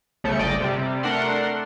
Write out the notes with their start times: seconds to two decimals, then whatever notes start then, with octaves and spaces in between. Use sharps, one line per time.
0.24 C2 C#3 A3 G6 C#7
0.38 G1 D5 D#5 G5 D6
0.60 C3 G3
1.03 A3 D4 A#4 F#5 C6